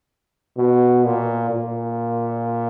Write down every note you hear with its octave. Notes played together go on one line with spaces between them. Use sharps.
B2
A#2
A#2